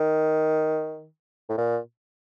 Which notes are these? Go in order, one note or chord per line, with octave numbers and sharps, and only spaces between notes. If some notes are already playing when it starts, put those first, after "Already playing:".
Already playing: D#3
A2
A#2